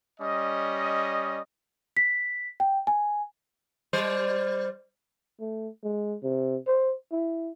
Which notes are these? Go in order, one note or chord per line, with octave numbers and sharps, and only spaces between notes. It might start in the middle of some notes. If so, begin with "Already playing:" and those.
G3 C#4 D#5
B6
G5
G#5
G3 C5 D5
A3
G#3
C3
C5
E4